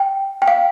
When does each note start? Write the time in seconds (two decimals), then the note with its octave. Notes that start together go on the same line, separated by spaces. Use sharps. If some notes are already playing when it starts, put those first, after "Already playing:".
Already playing: G5
0.42 G5
0.48 F5